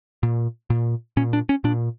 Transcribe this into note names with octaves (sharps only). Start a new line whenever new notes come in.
A#2
A#2
A#2 C#4
D4
C#4
A#2 D4